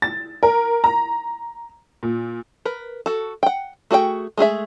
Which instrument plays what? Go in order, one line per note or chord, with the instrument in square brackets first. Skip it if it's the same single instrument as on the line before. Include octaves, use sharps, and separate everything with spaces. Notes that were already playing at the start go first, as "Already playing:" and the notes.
[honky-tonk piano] A6
A#4
A#5
A#2
[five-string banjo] A#4 B4
F#4 A4
F#5 G5
A3 F#4 G#4 D5 G5
G#3 A3 G#4 E5